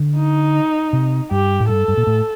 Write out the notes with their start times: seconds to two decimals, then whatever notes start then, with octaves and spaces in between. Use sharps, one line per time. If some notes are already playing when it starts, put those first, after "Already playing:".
Already playing: D3
0.17 D#4
0.93 C3
1.31 G2 G4
1.60 A2
1.69 G2 A4
1.88 G2
1.97 A#2
2.07 A2